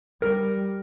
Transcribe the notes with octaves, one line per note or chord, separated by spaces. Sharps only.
G3 A#4